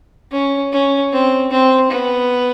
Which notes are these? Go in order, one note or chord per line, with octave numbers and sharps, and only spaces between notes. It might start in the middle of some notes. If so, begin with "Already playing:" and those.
C#4
C#4
C4
C4
B3